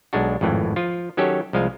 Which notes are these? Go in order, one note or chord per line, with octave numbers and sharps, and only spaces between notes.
B1 G#3 D4 F#4
G#1 F2 A2 E3
F3 F4
D#3 F#3 C#4 G4 A4 C#5
C2 F3 G#3 F5